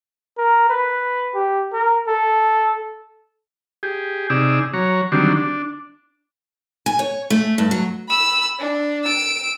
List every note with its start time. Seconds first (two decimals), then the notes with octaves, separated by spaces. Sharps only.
0.38 A#4
0.69 B4
1.34 G4
1.73 A#4
2.08 A4
3.83 G4 G#4
4.30 C3 D#4 G#4 D5 E6
4.74 F#3 C#5 A#5
5.12 D3 D#3 F#3 G3 C4 D4
5.37 D4
6.86 G#5
6.99 C#5
7.30 A3
7.58 G2
7.71 F#3
8.08 B5 E6
8.59 D4
9.04 E6 D7